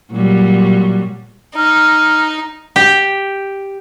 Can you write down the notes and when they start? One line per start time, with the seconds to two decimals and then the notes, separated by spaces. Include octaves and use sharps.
0.11 A#2 F#3 G3
1.56 D#4 F6
2.76 G4